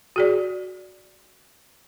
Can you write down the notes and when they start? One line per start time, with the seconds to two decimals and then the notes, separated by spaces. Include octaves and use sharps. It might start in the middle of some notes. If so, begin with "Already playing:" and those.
0.16 F#4 G#4 D5